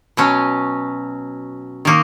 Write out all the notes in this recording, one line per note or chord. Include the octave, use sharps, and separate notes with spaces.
B2 F#3 C#4
D#3 A#3 D#4